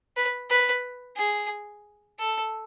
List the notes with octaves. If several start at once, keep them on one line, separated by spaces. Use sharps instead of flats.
B4
B4
G#4
A4